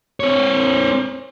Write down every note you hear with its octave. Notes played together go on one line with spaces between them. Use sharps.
C4 C#5